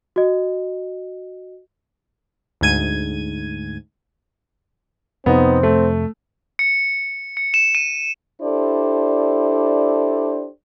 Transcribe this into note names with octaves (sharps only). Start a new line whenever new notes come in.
F#4 D#5
D2 G#2 G#6 D#7
F2 C3 B3 C4 D#4
A3
C#7
C#7
E7
D#7
D4 E4 G4 A4 C5 D5